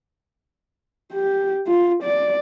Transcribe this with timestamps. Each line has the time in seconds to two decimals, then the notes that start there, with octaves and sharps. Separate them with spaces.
1.13 G4
1.67 F4
2.03 D5